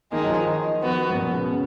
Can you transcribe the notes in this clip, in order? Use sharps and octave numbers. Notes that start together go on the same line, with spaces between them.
D#3 G#3 A#3 D#4
F#3
F3
D#3
F3 B3 F#4
G#2
A#2
B2
C#3
B2
C#3